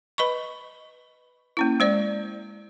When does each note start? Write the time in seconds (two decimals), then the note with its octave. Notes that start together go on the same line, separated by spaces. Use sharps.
0.18 B4 D#5 B5 C#6
1.57 A#3 C#4 E4
1.80 G#3 C5 D5